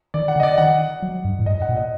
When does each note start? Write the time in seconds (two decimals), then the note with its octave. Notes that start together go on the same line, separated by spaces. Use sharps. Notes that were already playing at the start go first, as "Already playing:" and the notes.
0.14 D#3 D5
0.28 F#5
0.36 D3
0.40 D#5
0.43 D5
0.58 D#3 F#5
1.02 F#3
1.24 G2
1.39 A2
1.46 G2 D#5
1.62 F#5
1.69 A#2
1.77 D#5